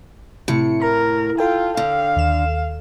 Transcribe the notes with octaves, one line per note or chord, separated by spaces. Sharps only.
A2 C3 E4 C#7
A#4 A#5
F4 A4 G5
D3 F5
D#2 E7